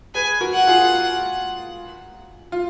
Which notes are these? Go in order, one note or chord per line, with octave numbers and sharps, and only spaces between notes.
G#4 B4 G#5
F#4 A#4
F#5
F4 G#4
F4